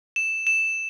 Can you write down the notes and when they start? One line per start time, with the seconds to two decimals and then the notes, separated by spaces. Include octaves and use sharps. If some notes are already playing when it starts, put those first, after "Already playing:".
0.16 E7
0.47 E7